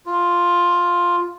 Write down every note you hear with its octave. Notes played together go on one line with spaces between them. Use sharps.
F4